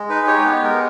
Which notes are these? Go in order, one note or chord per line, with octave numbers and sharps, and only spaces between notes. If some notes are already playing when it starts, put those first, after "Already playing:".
Already playing: G#3
D#4 B4
G4 C#5
B3 B4
G#3 A#4